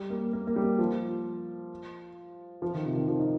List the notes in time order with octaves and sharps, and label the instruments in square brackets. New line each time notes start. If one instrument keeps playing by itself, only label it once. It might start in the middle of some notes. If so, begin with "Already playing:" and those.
Already playing: [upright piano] G3
A#3
A#3
A#3
G3
F3
F3
D#3
C3
D#3
F3
D#4